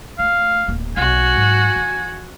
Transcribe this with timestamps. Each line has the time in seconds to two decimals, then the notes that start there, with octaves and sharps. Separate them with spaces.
0.19 A3 F5
0.68 D1 A#3
0.97 B1 F#4 G#5
1.34 G#2 F#3
1.76 E2